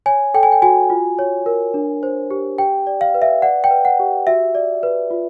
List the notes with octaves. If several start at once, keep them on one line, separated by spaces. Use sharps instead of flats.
C#5 G#5
A4 G5
G#5
G5
F#4 G#5
F4
C#5
A#4
D4
C5
G4
G4 G5
D5
F5
B4
E5
D5 F#5
G5
B4
F#5
G4
F#4 E5
D5
B4
F4